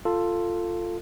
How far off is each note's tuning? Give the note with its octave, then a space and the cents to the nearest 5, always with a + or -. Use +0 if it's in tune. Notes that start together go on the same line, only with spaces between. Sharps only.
F4 +0 A4 +10